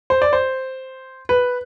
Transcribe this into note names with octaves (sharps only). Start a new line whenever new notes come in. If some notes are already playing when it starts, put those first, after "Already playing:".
C5
D5
C5
B4